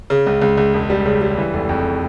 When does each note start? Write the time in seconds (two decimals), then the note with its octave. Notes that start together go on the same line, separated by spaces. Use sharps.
0.10 C#3
0.27 C#2
0.42 C#2
0.57 C#2
0.74 E1
0.90 G3
1.06 C#3
1.21 G3
1.37 E3
1.53 F1
1.69 F2